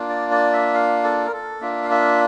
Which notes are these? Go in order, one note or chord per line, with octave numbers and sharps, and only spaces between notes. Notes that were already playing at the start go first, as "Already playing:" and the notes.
Already playing: A#3 D4 F4
D5
D5
E5
F5
A4
A#4
A4
A#3 D4 F4 E5
F5
E5